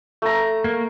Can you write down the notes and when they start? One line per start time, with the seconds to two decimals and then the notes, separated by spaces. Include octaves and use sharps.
0.22 A3 A#5
0.64 A#3